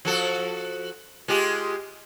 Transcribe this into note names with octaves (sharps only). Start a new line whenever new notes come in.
F3 F#4 A4
G#3 F4 G4